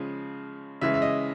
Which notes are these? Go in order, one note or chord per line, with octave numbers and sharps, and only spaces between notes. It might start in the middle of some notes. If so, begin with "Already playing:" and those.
Already playing: C#3 F3 G#3
C#3 E3 G#3 E5
E5
D#5